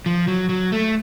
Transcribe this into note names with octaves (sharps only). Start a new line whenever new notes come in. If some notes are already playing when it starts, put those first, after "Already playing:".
F3
F#3
F#3
A3